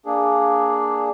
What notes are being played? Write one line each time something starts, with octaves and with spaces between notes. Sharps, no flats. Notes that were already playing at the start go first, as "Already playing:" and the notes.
A#3 D4 G#4